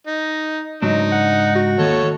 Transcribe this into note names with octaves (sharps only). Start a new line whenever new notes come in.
D#4
C#2 G#2 F#3 D4 D#4
F#5
F#4
D#2 A4 C#5